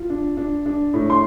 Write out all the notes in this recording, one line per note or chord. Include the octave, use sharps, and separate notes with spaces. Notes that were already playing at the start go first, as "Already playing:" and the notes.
Already playing: F4
D4
D4
D4
A2
C6